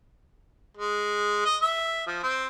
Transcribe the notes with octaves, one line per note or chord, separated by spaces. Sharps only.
G#3
D#5
E5
F3
C4